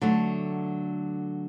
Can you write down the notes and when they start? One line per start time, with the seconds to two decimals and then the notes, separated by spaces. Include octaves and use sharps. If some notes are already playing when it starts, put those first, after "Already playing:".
0.01 D3 F#3 A3